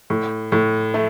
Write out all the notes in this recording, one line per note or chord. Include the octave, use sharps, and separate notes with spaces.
A2
A2
A3